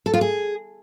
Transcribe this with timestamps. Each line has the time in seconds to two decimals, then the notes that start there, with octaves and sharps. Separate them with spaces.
0.06 A4
0.14 F4
0.21 G#4